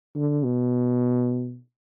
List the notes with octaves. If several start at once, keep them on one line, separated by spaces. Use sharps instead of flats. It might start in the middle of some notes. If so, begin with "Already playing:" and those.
D3
B2